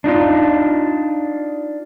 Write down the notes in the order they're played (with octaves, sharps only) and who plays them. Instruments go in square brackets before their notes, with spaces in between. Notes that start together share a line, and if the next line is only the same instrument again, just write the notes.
[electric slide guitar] D4 D#4 F4